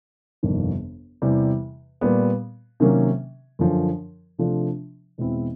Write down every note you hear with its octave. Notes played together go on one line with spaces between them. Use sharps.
G1 F2 C3 D#3 G3
E2 C3 E3 G3
A#2 G3 B3
C3 D#3 F#3 A#3 C#4
F#2 D3 F3
C3 F3 A3 D4 F4
E2 B2 G#3 C4 E4